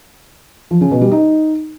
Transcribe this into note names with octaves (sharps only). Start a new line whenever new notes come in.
F3
C#3
B2
G3
D#4